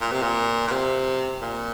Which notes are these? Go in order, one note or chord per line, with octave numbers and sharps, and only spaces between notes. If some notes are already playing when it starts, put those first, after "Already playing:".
A#2
C3
A#2
A#2
C3
A#2